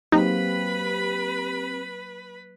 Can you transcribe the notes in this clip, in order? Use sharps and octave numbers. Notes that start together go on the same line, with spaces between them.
F#3 A#3 C4 D#4 G4 B4 C5 B5